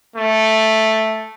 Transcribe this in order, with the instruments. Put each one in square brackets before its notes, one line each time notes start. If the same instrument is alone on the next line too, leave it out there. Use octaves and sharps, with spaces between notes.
[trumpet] A3